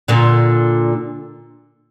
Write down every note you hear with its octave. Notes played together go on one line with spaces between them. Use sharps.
A#2 D3